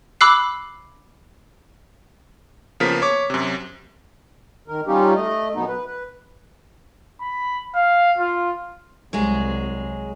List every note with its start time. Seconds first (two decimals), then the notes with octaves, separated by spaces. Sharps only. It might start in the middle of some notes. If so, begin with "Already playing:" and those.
0.21 B5 D6 E6 F#6 C7
2.80 C#3 F3 A#3 B3 A#4 B6
3.02 C#5 D6
3.30 F#2 C3
4.68 D#3 A#4
4.87 G3 C#4 D#4 F4 G4
5.16 A3 D#5
5.55 F#2 B2 B3 D#4
5.68 B4
5.86 B4
7.21 B5
7.75 F5
8.17 F4
9.13 C2 F#3 G#3 G#4